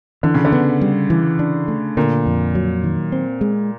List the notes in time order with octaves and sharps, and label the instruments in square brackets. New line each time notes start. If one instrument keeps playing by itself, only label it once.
[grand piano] D3 [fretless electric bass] E3
[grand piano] C#3
D3
[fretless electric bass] B3
G3
E3
D4
A3
[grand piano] A#2 [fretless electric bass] D3
[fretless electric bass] F2
F#3
D#3
C4
G#3